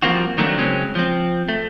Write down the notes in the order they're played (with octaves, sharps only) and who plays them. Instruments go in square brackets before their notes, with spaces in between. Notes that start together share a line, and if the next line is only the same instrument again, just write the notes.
[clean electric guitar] F3 G3 A#3 C4 F4 F#4
D#3 F#3 A3 A#3 C4 D4
C#3 F#3 G#3 C4 C#4
F3 C4
A3